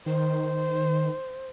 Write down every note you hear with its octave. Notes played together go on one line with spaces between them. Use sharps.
D#3 C5